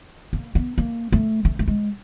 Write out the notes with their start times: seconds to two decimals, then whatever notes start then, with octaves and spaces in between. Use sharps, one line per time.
0.33 A#3
0.55 B3
0.78 A#3
1.12 A3
1.45 A3
1.59 A3
1.68 G#3